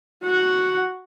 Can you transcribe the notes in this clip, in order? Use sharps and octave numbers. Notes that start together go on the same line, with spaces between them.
F#4 F#5